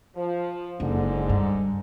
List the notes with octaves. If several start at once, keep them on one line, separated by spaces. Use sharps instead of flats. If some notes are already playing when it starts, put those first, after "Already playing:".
F3
F#1 G#2 D3
G2